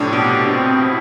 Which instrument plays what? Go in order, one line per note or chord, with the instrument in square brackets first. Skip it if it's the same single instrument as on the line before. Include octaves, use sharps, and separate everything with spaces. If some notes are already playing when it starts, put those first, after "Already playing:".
Already playing: [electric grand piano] A2 C3 F3 [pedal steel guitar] D4
[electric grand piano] B2 [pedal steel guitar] G4
[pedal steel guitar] C4
E4